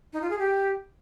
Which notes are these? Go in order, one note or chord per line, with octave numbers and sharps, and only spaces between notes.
D#4
F4
G#4
G4